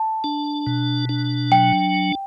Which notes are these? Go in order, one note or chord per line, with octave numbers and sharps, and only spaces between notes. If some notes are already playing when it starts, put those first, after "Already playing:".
Already playing: A5
D4
B2
D4
F#3 G5